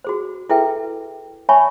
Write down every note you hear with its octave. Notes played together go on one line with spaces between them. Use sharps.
F#4 G#4 C5
E4 G#4 A4 B4 E5 G5
C#5 E5 G#5 A5 B5 C#6